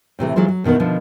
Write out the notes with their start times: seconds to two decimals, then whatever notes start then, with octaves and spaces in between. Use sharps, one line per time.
0.19 A2 C3 E3 A3
0.36 E3 F#3 G#3 F4 C5
0.48 F#3
0.64 E2 B2 D#3 A3 B3
0.80 B2 D3 D#3 F3